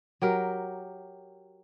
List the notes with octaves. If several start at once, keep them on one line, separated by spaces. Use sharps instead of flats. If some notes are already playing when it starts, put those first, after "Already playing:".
F#3 G4 A#4